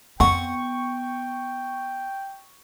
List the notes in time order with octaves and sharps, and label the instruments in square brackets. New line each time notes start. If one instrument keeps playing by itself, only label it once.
[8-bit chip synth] F2 F#5 [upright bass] B3 [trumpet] G5 [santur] C#6